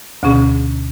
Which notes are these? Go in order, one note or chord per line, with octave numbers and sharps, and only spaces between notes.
D2 B2 D3 C#4 G#4